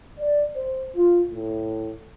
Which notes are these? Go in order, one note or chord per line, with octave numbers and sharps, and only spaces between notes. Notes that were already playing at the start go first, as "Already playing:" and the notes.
D5
C5
F4
A2